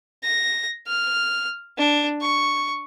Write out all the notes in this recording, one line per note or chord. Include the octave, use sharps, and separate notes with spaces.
A#6
F6
D4
C#6